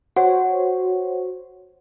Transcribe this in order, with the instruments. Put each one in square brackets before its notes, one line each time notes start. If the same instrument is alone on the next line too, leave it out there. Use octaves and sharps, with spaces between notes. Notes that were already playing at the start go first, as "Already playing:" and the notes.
[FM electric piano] F#4 C5 C#5 [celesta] F#5